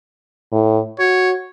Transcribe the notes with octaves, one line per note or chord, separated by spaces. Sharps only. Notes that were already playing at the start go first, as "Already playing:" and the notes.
A2
F#4 C#5